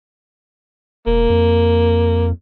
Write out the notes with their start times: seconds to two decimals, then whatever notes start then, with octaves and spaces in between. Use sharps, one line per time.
1.07 E1 A#3
1.30 F2